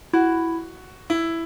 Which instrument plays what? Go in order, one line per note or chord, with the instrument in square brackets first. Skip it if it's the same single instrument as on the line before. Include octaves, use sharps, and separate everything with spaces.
[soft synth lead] E4 [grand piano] F#4
[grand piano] E4